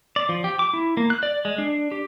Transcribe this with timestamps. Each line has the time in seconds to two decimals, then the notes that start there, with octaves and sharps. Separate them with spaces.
0.16 D5
0.29 F3
0.44 G4
0.59 D6
0.74 E4
0.97 A#3
1.10 F#6
1.23 D5
1.45 G#3
1.58 D4
1.92 G4